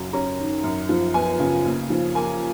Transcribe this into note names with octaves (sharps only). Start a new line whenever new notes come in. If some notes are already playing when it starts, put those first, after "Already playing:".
Already playing: F#2 C#3 F#3
C#4 A#5
D#3
F#2
F3
B3 G#5
C#3
D#2
F3
A#3 G#5